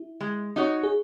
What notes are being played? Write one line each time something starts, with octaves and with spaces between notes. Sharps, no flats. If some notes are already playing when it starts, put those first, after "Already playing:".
Already playing: E4
G#3
D#4 F#4 C#5
G#4